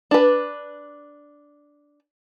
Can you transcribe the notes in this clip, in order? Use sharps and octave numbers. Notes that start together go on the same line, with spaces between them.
D4 B4